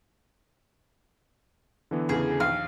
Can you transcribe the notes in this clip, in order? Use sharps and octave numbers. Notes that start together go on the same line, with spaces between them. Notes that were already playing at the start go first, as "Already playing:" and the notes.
D3 E3 B3
E2 C#3 G#4
A#1 D#2 F5